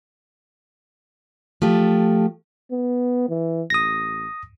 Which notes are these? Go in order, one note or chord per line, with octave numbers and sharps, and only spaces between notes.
F3 A3 G4
B3
E3
A1 D#6 A#6